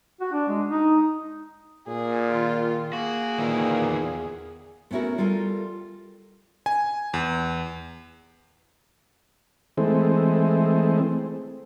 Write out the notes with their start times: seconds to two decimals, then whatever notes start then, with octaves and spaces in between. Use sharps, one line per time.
0.21 F#4
0.32 D4
0.48 G#3
0.67 D#4
1.88 A#2 G#4
2.30 D#3 F4
2.93 A#3 F#4 G#4
3.39 A#2 D#3 E3
3.83 E2
4.91 A3 B3 C#4 E4 F#4 A#4
5.18 G3 F4 A4 A#4 G#5
6.66 G#5
7.14 E2
9.78 E3 G#3 A3 C4